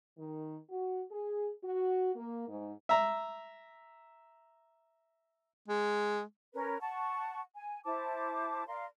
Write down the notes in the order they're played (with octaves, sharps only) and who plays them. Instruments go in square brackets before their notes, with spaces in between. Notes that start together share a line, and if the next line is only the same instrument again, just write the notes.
[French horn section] D#3
F#4
G#4
F#4
A#3
G#2
[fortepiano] E5 A#5
[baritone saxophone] G#3
[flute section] C#4 A#4 B4
F#5 A5 C#6
G#5
E4 C5 A5 D6
A#4 D5 F5 C6